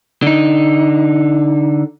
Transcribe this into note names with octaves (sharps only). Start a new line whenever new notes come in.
D3 D#4